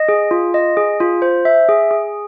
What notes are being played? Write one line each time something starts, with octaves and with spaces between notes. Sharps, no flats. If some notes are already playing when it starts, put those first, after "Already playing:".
Already playing: D#5
G#4
F4
D#5
G#4
F4
C5
E5
G#4
G#4